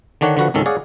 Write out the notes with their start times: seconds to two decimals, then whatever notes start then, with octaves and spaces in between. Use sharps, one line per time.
0.21 D3 D#3 D4 C#5 F#5
0.37 D3 F3 F#4 B4 F#5
0.54 G#1 C#2 D#3 C#4 A4
0.66 G#4 C#5 D5 F5 F#5